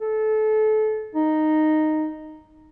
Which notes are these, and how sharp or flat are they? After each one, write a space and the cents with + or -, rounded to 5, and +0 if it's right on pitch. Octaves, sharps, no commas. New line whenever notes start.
A4 -25
D#4 -5